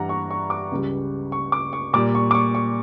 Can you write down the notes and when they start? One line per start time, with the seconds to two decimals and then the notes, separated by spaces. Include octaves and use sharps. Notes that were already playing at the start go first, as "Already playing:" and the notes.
Already playing: G2 E3 G3 F#5 A#5
0.09 C#6
0.31 C#6
0.50 D6
0.71 C#2 C#3 G3
1.32 C#6
1.52 D6
1.73 C#6
1.93 A#2 G3 D6
2.15 C#6
2.31 D6
2.35 C#6
2.55 C#6